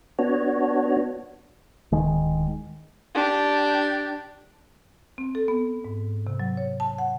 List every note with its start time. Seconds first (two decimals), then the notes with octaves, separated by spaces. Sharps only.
0.19 B3 D4 F#4 C#5
1.92 D1 D#3 G#3
3.15 D4 G4
5.18 C4
5.35 A4
5.48 B3
5.85 G#2
6.27 C3
6.40 F#3
6.57 C#5
6.80 A5
6.98 F#5